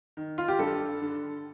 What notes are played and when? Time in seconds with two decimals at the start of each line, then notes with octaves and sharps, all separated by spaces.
0.17 D#3
0.38 F4
0.48 G4
0.59 G2 A4
1.02 D3